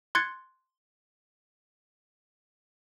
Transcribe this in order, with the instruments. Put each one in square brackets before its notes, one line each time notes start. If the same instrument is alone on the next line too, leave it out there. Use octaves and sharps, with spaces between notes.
[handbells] C6 F#6 G#6 A6 C#7